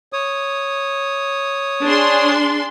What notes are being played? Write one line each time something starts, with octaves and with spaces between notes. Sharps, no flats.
C#5 D#6
D4 G#4 C6